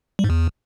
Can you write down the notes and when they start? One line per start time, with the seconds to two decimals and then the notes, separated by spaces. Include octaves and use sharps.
0.19 G3
0.24 G#2
0.30 E2